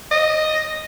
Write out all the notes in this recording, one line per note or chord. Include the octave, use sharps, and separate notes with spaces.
D#5